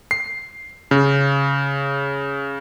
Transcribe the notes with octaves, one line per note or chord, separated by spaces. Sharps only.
C7
C#3